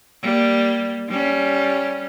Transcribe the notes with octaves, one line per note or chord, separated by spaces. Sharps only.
G3 A#3
G3 C#4